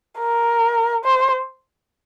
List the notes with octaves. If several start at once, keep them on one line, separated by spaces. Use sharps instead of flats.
A#4
C5